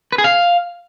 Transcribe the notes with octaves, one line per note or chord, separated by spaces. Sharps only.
B4
G#4
F5